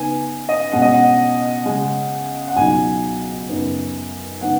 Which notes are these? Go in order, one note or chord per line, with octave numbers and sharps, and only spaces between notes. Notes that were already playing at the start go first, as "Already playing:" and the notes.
Already playing: C#3 B3 D#4 G#5
D#5
B2 G#3 C#4 F#5
D#5
F#5
C#3 G#3 C#4
F#5
C#2 B2 F#3 D#4 G#5
F#2 C#3 B3 D#4
C#3 G#3 B3 D#4 F#5